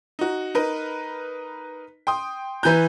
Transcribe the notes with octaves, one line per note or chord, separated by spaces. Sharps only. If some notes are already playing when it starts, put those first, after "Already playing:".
D#4 F#4
D#4 A#4 B4
G5 C6 D#6
E3 B4 A#5 G6